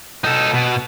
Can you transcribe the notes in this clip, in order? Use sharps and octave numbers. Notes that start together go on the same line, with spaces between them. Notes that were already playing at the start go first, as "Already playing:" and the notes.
D#4 A4
B2